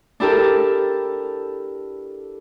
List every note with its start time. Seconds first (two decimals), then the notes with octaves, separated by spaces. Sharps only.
0.20 D4 E4 G4 A4 A#4